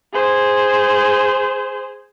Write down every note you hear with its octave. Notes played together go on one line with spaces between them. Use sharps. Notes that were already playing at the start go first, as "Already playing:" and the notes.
G#4 C5